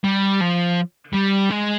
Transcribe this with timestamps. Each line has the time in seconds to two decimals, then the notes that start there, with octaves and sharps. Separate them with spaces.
0.04 G3
0.41 F3
1.14 G3
1.51 G#3